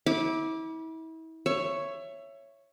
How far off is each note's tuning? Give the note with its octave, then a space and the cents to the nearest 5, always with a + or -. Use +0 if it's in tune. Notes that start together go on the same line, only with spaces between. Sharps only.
E4 -35 D6 +0
C#5 +0 E5 +20